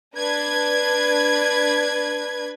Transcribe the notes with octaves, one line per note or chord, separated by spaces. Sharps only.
D4 B4 G#6